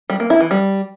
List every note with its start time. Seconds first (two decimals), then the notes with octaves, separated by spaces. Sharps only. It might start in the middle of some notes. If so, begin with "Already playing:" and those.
0.10 G3
0.20 A#3
0.30 E4
0.40 E3
0.51 G3